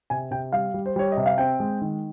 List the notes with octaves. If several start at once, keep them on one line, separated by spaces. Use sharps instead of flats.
C3 G#5
C3 G5
G3 F5
G3
C5
G3 C#5
D#5
C3
F5
C4 G5
G#3
D#3